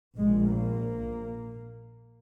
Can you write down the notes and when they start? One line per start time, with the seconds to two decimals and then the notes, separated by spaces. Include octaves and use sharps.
0.18 A#1 A#2 G#3
0.49 A#3